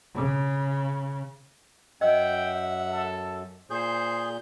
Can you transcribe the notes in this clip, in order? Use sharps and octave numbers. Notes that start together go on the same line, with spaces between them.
C#3
F#2 D#5 E5 F#5 G5
A4
A#2 G#4 C5 G6